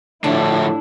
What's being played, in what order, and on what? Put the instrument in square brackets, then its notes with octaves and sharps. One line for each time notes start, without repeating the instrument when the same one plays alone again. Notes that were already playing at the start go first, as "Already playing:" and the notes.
[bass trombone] A2 [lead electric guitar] D3 F3 [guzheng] D4 [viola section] E4